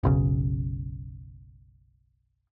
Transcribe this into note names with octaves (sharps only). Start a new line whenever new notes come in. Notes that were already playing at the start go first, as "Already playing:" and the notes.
F#1 B1 C#3